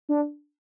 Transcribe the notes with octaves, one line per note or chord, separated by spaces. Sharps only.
D4